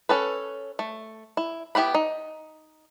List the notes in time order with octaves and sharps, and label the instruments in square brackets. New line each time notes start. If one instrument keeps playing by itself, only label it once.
[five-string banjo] C#4 A4 B4
A3
E4
B3 E4 G4 F#5 B5
D#4